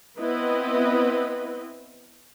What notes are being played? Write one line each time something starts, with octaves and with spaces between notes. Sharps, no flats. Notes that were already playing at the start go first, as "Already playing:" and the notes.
B3 C4 E4 B4 D#5